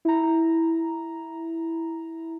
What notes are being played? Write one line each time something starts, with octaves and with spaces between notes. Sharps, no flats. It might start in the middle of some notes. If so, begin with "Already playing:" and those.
E4 A#5